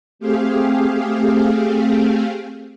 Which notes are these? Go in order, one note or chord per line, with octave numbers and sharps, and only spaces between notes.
A3 C4 G4 G#4 F5